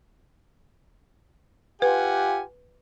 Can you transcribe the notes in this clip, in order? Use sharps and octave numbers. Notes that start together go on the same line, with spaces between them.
F4 G4 B4 F#5 G#5